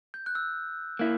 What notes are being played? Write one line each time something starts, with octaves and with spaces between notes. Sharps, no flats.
G6
F#6
E6
A#3 E4